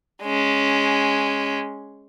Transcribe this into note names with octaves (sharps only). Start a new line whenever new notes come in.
G#3 C#4